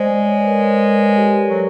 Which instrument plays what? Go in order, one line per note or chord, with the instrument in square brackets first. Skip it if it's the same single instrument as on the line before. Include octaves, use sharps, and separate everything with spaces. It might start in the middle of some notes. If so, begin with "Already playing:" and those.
Already playing: [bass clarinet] G#3 [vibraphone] C5 D5
[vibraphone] C#5
C5
B4
A#4 C5
G4 A4
[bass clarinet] F#3